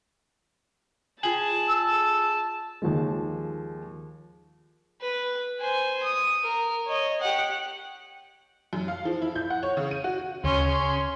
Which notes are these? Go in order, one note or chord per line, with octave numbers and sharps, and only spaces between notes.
F4 G#4 A5 F#7
E6
D#2 F3 G#3
B4
C5 G#5
D#6
A#4
C#5 D#5
G4 F#5
F#2
F5
F3
E4
G6
F#5
C#5
C#3
D#7
F#4
D2 C#3 C#4 C6